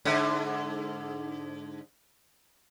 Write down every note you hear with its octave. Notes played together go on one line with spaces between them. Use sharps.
G#2 D3